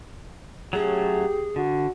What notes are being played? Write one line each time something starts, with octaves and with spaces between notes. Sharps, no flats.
F#3 A3 C#4 G4 G#4
D3 F#4